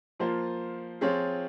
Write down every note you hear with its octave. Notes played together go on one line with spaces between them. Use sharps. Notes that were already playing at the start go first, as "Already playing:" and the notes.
F3 A#3 F4 C5
F3 C4 F4 G#4 C#5